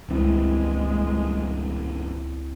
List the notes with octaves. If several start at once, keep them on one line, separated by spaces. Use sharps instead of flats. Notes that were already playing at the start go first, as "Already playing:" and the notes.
D#1 C#2 G2 E3 G#3 C4 E4